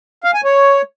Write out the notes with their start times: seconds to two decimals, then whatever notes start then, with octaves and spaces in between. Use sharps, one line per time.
0.24 F5
0.34 G#5
0.44 C#5